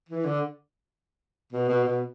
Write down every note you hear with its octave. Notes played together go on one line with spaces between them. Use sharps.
E3
D3
B2
B2
B2